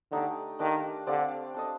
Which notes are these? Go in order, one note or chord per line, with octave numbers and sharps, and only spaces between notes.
D3 A3 D#4 G4 D5
D#3 D4 G4 D5 F5
D3 C4 G4 D5 F5
D4 A4 D#5